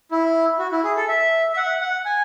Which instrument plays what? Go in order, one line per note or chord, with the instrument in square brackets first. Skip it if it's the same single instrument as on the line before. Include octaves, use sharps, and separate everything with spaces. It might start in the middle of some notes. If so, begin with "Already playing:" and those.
[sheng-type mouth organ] E4
F#4
E4
G#4
A4
E5
E5
F#5
F#5
G#5